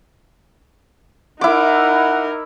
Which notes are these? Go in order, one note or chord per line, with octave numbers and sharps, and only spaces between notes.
D#4 E4 A#4 F#5 D6